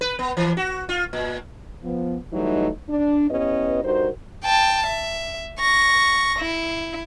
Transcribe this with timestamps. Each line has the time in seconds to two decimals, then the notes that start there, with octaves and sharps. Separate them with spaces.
0.01 B4
0.19 B3
0.37 E3
0.57 F#4
0.89 F4
1.13 A#2
1.84 F3 B3
2.33 E3 F#3 G3 A3 D#4
2.89 D4
3.30 B3 C#4 E4 G4 B4 D#5
3.84 G2 D#4 F#4 A#4 C5
4.44 G5 A5
4.86 E5
5.59 C#6 A#6
6.39 E4